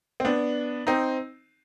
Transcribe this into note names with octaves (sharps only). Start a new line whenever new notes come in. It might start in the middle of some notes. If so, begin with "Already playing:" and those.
C4
B3 D4
C4 D#4